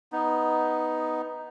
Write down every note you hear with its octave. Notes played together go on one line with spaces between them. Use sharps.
B3 D#4